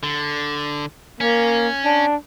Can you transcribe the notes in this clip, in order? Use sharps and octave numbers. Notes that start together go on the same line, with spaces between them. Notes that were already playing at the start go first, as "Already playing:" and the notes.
D3
A#3 C#4
D4